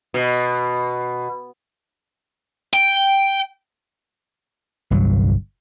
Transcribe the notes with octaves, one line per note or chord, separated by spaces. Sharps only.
B2
G5
G1 C2 G2 F#3